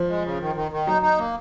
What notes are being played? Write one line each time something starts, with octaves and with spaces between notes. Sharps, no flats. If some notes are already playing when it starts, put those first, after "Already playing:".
Already playing: F3
G#3
C#3
D#3
D#3
D#3
F#3 D#4
D#4
A#3